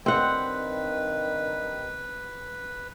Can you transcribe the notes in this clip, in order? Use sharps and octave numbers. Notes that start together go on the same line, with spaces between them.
G2 D#3 C4 B4 F#5